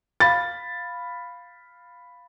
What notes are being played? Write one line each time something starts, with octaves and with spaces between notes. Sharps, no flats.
F5 B5 A6